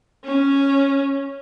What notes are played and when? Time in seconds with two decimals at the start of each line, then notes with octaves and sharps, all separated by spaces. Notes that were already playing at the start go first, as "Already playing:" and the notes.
0.25 C#4